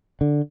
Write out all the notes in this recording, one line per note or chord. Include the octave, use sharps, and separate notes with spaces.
D3